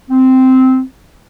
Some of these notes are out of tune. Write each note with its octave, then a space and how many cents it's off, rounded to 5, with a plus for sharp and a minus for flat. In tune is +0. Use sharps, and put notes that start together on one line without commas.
C4 -10